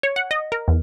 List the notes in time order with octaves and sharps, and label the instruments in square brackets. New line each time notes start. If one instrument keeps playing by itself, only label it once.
[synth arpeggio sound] C#5
F#5
D#5
A#4
E2